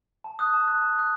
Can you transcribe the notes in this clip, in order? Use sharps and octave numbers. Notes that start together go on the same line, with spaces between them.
A5
D#6 F#6
A5
D#6 F#6
A5
D#6 F#6